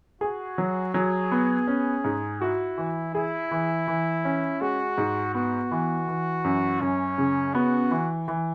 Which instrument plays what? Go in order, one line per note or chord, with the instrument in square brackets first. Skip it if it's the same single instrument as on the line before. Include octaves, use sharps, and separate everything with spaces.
[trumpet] F#4 [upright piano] G#4
[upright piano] F#3
[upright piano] F#3 [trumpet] G#4
[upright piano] B3
C#4
G#2
[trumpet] E4 [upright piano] F#4
[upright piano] E3
[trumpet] E4 [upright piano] G#4
[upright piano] E3
E3
C#4
[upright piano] G#3 [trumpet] F#4
[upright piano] G#2
[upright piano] B3 [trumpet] F#4
[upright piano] E3
E3
F#2
[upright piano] F#2 [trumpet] C#4
[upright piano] C#3
[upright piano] B3 [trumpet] F#4
[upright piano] E3
E3